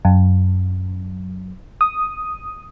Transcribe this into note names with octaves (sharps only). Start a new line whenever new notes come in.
F#2
D#6